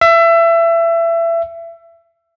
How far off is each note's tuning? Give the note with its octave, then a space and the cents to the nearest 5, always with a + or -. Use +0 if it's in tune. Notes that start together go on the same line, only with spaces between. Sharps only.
E5 +25